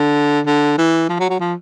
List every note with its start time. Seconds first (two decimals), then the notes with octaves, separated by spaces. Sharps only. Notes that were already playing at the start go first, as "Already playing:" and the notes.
Already playing: D3
0.46 D3
0.78 E3
1.09 F3
1.20 F#3
1.30 F#3
1.40 F3